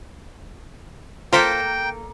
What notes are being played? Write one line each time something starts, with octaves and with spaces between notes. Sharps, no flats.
A#3 F4 A4 A#4 C5 G5 B6